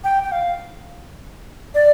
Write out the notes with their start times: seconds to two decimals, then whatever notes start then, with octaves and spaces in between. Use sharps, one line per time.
0.04 G5
0.24 G5
0.32 F5
1.75 D5